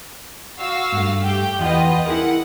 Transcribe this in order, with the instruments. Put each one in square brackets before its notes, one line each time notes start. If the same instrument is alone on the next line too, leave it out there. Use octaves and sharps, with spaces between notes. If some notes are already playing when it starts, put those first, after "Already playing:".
[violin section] F#4 F5 E6
[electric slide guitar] G2 A3
[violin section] G4 G5 G6
[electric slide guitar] E2 F#5 G5 [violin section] F4 B4 D#5
[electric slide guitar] E4 G#4 A#4 [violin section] F#5